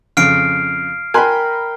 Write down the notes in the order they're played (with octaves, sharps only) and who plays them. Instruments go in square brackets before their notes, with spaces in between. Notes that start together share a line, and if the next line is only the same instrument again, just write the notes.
[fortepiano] F2 C#3 [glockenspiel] F6 C7 D7
[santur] A#4 G5 B5 [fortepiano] G#5 C6 F#6